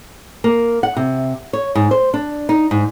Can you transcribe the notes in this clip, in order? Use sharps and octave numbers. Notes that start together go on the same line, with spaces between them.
A#3
F#5
C3
C#5
G#2
C5
D4
D#4
G#2